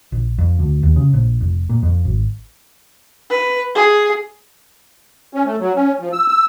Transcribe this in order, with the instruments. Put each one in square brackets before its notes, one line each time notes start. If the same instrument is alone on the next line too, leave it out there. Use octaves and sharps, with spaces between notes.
[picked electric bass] A#1
F2
D2
D#2
C#3
A#1
F1
A#2
F2
G#1
[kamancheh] B4
G#4
[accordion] C#4
A3
F#3
C#4
F3
E6
E6